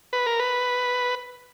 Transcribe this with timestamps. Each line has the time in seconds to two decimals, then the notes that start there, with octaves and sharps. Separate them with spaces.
0.13 B4
0.26 A#4
0.39 B4